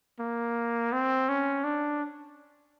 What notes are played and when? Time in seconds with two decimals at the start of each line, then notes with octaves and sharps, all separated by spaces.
0.19 A#3
0.92 C4
1.28 C#4
1.64 D4